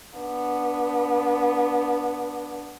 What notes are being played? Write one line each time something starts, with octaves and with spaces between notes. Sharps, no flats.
B3 D4